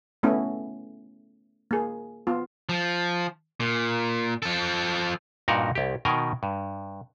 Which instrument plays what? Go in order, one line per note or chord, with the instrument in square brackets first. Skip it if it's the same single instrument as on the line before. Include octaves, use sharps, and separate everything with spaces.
[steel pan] A3 B3 C#4 E4
A#3 G#4
B3 F4
[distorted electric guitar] F3
A#2
F3 A4
[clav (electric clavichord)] G2 A#2 D#4 F#4 A#4 F#5
C2 G4
B2 D#3 A#4 G5 G#5
G2